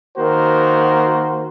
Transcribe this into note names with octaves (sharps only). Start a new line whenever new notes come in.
D#3 A#3 F#4 A#4 C5